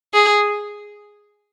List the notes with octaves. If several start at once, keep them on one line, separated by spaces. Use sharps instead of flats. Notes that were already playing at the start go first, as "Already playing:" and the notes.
G#4